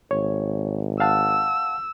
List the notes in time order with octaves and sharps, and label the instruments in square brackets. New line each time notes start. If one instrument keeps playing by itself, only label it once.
[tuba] G#1 [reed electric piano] C#5
[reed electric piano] F5 F#5 A5 [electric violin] E6